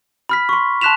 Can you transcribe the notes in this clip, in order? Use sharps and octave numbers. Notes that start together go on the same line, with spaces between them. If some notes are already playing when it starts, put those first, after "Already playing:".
B5 F6 B6
C6 C#6
A5 C6 F#6 B6 E7 F7